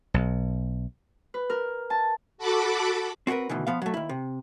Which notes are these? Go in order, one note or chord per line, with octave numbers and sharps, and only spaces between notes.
B1
B4
A#4
A5
F#4 A4 A5 B5 D6
C4 F#4 G#4 A#4 B4
D2 B2 D#3 E3
F3 B3 F5
F#3 A3
D#2 E4
C3